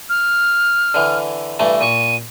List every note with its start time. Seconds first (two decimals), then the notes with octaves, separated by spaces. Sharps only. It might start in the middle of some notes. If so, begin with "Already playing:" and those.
0.09 F6
0.94 D3 E3
1.60 G2 E3 A3
1.81 A#2 C#6 D#7